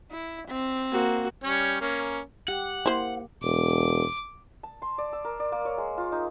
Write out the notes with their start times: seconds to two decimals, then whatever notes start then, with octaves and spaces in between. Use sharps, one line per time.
0.11 E4
0.48 C4
0.92 A#3 F#4
1.44 G3 C#4 C#5
1.81 A#3 C#4
2.48 G4 F#5
2.86 A#3 E4 C5
3.42 E1 D6
4.63 A5
4.82 C6
4.98 D5
5.13 E6
5.25 A#4
5.40 D5
5.52 A#3
5.65 C#5
5.78 G#3
5.98 F4
6.12 D#4